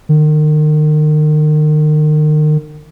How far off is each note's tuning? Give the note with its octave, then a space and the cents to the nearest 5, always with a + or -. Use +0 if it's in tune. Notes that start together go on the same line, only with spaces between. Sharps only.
D#3 -35